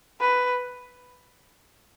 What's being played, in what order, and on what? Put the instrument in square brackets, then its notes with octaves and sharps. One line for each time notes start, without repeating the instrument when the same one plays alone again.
[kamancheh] B4